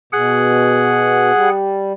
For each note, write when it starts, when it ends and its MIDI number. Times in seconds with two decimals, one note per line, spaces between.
0.13 1.31 47
0.13 1.49 68
0.13 1.49 78
1.34 1.93 55